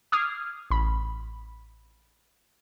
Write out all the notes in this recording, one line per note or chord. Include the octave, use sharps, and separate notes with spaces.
D6 D#6 F6 G#6 C7
A1 B5